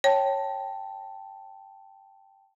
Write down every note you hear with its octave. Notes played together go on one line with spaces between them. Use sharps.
C#5 G5 A5